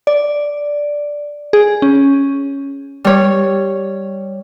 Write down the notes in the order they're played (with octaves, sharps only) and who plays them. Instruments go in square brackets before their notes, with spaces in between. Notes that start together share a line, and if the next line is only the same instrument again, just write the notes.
[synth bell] D5
G#4
C#4
[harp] G3 C#5